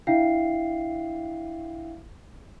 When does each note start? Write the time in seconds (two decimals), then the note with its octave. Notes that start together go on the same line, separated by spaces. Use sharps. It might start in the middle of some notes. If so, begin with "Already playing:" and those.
0.07 D4 E4 E5 F5 G5 C7